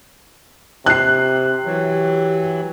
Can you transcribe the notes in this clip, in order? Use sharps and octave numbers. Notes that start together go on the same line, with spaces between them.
C3 F#6 C7
E3 F#3 G4